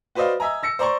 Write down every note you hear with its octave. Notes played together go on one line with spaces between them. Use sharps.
F#4 B4 C5 D5 D#5 F5
D#5 E5 G#5 A#5
E6 A#6 C#7
C5 D5 A#5 C6 C#6